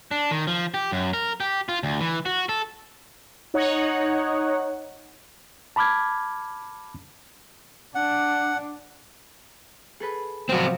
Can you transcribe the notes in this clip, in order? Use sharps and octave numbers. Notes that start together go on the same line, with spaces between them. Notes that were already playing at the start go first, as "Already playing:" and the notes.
D4
D#3
F3
G4
F#2
A#4
G4
F4
D2
E3
F#4
A4
D#4 C#5 F#5
A5 B5 D6 F6 G#6
D4 F#5
G#4 A4 B4
C3 F3 F#3 C4 F#4